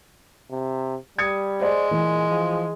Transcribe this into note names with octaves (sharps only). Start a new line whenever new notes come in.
C3
G3 D#6 G#6 C#7
G#3 C5 D5
A#2 E3
F3